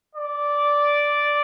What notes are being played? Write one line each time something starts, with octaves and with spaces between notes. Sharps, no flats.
D5